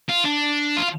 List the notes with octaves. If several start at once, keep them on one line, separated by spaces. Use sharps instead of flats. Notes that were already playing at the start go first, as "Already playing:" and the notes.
F4
D4
F4